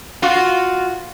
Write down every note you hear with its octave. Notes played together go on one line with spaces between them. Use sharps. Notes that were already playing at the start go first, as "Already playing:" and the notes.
F4 F#4